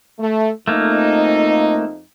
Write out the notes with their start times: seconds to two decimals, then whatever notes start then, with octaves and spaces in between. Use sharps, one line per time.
0.19 A3
0.68 F2 A3 A#3 D#4